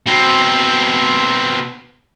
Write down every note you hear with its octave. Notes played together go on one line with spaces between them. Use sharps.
B2 C4